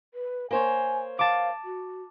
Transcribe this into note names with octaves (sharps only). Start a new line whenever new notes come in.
B4
A#3 C5 C#5 G#5
F5 A5 D6
F#4